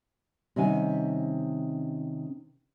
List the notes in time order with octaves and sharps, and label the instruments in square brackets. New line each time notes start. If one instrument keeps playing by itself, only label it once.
[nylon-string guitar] C3 D#3 G3 C#4 F#5 G#5